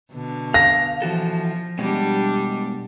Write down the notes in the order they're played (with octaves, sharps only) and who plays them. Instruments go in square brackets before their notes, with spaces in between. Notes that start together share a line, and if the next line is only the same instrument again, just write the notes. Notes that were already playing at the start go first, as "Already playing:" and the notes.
[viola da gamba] B2 D3
[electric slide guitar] F5 [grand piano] A#6
[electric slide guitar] E3 F#4 A4 [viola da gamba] F3
[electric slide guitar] B2 G#3 [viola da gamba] G3 D4